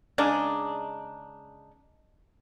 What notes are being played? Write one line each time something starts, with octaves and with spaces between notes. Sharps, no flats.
C#3 G#3 D4 D#4